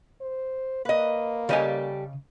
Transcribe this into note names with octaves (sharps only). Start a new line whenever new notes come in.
C5
A#3 B4 D#5
C#3 G3 G4 A4 D#5 G#5